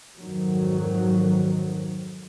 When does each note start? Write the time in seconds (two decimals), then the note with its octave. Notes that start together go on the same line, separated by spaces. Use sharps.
0.19 F2 G#2 D#3 F#3